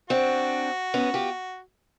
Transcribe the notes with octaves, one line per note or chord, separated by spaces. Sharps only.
C4 D4 F#4
B3 C#4
F4 G4